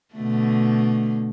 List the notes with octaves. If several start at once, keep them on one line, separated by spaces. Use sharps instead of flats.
B2 D3 A3